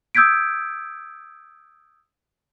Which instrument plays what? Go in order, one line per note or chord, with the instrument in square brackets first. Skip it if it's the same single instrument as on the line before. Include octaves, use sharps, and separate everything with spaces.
[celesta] D#6 E6 G6 G#6 B6 D7